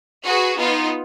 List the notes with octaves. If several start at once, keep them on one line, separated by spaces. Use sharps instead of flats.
F#4 G#4 B4
B3 D#4 F4